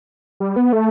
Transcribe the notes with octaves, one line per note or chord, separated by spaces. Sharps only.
G3
B3
A3